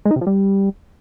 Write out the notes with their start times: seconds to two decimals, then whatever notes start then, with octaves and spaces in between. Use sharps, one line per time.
0.05 G#3
0.11 D#4
0.16 C3
0.21 F3
0.27 G3